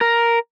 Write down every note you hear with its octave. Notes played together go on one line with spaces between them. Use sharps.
A#4